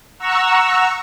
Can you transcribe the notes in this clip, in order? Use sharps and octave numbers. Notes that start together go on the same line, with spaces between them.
F#5 A#5 C#6 E6